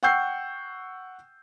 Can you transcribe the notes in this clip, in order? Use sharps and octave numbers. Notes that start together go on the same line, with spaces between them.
F#5 G5 C#6 E6 G6 C7